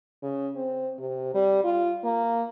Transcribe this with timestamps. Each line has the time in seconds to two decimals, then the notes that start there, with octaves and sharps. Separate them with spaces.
0.22 C#3
0.56 C4
0.99 C3
1.34 G3
1.64 F4
2.04 A#3